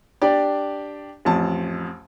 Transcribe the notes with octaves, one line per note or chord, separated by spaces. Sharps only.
D4 G4 D5
A1 F2 A5